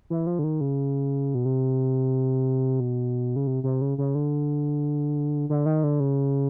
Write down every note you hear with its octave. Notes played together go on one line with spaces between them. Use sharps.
E3
F3
D3
D#3
C#3
B2
C3
B2
C#3
C3
C3
C#3
C#3
D3
D3
D#3
D3
C#3